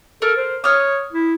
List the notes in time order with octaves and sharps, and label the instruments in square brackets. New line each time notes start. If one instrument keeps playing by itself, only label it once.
[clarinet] A4 [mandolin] A#4
[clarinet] C5
[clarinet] C#5 [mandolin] D#6 F6
[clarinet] E4